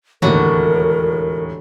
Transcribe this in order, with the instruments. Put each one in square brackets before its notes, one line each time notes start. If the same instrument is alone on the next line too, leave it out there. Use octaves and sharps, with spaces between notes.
[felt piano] E1 D#2 A2 [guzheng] D3 F#4 [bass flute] A#4